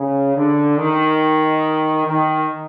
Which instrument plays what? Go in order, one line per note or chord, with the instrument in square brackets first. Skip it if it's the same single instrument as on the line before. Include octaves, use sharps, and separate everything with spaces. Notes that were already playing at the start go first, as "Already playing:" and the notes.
Already playing: [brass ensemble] C#3
D3
D#3
D#3